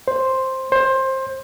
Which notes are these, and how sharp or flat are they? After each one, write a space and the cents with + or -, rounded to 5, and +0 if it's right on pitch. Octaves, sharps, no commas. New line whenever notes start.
C5 +5
C5 +20